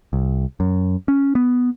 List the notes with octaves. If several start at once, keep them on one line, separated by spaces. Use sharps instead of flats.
C2
F#2
C#4
B3